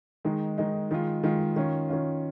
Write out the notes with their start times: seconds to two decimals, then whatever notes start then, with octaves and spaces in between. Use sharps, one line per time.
0.25 D#3 G#3 D#4
0.58 D#3 G#3 D#4
0.91 D#3 G#3 F4
1.23 D#3 G#3 F4
1.56 D#3 C#4 F4
1.89 D#3 C#4 F4